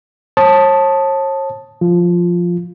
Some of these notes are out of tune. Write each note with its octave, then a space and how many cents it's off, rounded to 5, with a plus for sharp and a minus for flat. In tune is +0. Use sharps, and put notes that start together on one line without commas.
C#5 -40 A5 +0 D#6 +0
F3 +0 F4 +0